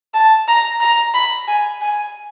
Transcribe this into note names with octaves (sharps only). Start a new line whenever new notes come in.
A5
A#5
A#5
B5
G#5
G#5